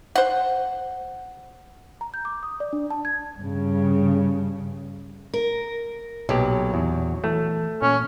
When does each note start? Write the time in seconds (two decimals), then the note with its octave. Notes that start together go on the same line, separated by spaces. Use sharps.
0.15 C5 F#5
2.01 A#5
2.14 G6
2.25 D6
2.43 D#6
2.60 D5
2.73 D4
2.90 A5
3.05 G#6
3.37 G2 C#3
5.33 A#4
6.29 B1 A#2 F#3 G4
6.74 E2
7.24 E3 A3
7.82 A#2 C#4